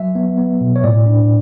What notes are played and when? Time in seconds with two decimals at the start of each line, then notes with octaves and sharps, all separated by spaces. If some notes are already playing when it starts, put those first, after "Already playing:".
Already playing: F#3 E5
0.15 B3
0.38 B3
0.61 B2
0.76 C#5
0.84 A2 D5
1.06 D4